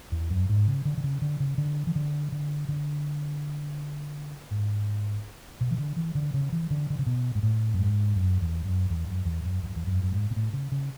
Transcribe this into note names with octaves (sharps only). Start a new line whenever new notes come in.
E2
F#2
G#2
C#3
D3
D3
C#3
D3
C#3
D3
E3
D3
D3
D3
G#2
B2
E3
D3
E3
D3
C#3
E3
D3
D3
C#3
B2
G#2
A2
F#2
G#2
F#2
E2
F#2
E2
F#2
E2
F#2
E2
F#2
E2
F#2
F#2
G#2
B2
A2
C#3
C#3